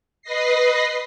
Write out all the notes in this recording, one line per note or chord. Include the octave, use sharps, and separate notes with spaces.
B4 D#5 A#6 C7